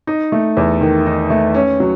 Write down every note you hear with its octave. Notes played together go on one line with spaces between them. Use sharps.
D#4
A3
E2
D#3
D#4
A3
C#4
F#3